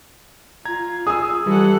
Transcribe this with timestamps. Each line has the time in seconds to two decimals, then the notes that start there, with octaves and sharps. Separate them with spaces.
0.65 F4 A#5 G#6
1.07 G#4 G#5 D#6 E6
1.47 E3 G3 A4 F#5